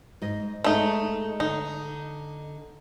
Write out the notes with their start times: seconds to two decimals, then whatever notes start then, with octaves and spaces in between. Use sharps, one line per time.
0.22 G#2 D#5
0.64 G#3 A3 D#4
1.40 D3 D#4